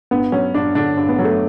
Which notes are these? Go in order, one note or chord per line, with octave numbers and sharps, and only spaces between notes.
G2 B3
F#3 C#4
G2 D4
D3 D4
G2
B3
F#3
A3